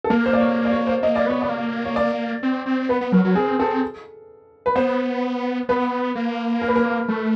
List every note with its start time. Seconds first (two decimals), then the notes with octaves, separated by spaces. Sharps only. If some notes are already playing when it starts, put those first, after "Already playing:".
0.04 A4
0.10 A#3 A#4
0.26 C5
0.33 D5
0.40 C#5
0.65 D5
0.71 C#5
0.87 C5
1.03 A#3 D#5
1.16 D5
1.26 B3 C#5
1.42 D5
1.49 A#3
1.85 C#5
1.96 D5
2.43 C4
2.66 C4
2.89 B3 B4
3.01 B3
3.12 F#3 A#4
3.24 F#3
3.35 C4 G#4
3.59 C4 A4
4.66 B4
4.75 B3 C5
5.69 B3 B4
6.15 A#3
6.62 A#4
6.68 B4
6.76 A#4
7.08 A3